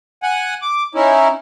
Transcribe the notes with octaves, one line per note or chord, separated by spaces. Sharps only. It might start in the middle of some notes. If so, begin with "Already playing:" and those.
F#5 G#5
D6
C#4 D#4 E4